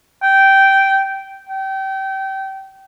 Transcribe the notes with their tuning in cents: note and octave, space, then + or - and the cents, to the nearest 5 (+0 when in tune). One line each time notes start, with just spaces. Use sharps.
G5 -10
G5 -25